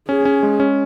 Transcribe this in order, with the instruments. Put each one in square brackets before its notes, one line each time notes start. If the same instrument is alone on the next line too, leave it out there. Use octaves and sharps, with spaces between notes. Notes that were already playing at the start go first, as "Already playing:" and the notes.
[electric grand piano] C#4 [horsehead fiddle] G#4
[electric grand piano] C#4
G#3
C#4